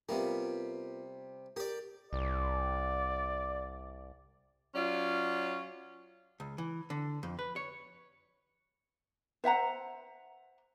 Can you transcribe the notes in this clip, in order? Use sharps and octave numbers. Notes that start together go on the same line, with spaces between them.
C3 G3 B3 F4 A#4
G4 A#4 D5
C2 D5
F#3 C#4 F4 D5
C#2
E3
D3
F2
B4
C#5
C5 E5 F#5 A#5